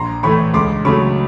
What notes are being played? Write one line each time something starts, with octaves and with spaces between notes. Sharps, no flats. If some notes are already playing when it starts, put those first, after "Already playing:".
Already playing: A#1 A#5 C6
A2 E3 A3 B5 C#6
C#2 C6 D6
C#3 F#3 A3 B5 C#6